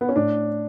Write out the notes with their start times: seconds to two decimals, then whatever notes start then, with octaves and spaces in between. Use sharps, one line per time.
0.01 B3
0.09 C#4
0.16 A2 D4